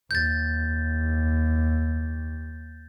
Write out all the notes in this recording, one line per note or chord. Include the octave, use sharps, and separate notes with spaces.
D#2 G6 A6